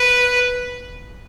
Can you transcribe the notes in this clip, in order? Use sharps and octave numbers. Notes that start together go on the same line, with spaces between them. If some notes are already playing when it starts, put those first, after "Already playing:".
Already playing: B4